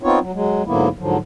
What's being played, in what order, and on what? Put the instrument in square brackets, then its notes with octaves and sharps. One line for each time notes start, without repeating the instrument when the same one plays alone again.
[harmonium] B3 C4 D#4 F4 C#5
F#3
F#3 G#3
G#2 D3 F#3 A#3 B3 E4
G#2 D3 F3 F#3